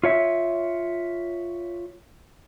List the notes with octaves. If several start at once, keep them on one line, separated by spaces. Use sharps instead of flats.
F4 C#5 E5